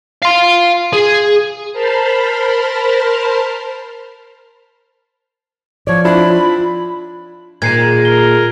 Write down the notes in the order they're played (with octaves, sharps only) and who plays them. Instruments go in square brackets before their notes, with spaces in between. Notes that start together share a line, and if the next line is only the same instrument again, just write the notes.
[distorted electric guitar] F5 C6
G#4
[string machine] A#4 C5 A5 B5 C6 F6
[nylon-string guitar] F3 D5 [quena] C#5
[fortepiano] C4 D4 E4 [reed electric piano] F4 [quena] B5
[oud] A#2 [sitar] D#3 G#3 [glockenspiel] G#6 C7 D#7
[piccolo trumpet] A#4 [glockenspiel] G7